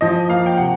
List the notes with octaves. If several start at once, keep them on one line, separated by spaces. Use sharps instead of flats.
F3 D#5
A#3 F5
G5
C3 F#5